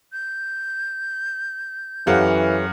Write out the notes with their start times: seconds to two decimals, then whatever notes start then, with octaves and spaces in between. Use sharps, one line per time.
0.13 G6
2.07 F#2 E3 G4 A4 C#5 F5 F#5